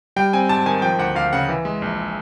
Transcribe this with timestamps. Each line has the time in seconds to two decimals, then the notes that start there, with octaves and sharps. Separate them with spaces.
0.16 G3 G5
0.33 C4 G#5
0.49 G#2 A5
0.66 D#3 G#5
0.82 F3 G5
0.99 D2 F#5
1.15 D2 F5
1.33 C#3 F#5
1.49 E3
1.65 G#3
1.82 A#1